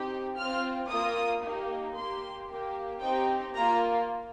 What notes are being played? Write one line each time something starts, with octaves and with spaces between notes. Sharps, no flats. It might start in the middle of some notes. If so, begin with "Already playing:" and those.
Already playing: C4 D#4 G4
C4 F4 F6
A#3 F4 D#6
A#3 D#4 G4
A#3 G4 C6
A#3 G4
C4 D#4 G4 G5
A#3 F4 A#5